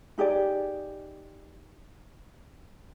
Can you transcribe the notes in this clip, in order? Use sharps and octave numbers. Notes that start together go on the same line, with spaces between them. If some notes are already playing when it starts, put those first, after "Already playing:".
D#4 G4 G#4 D5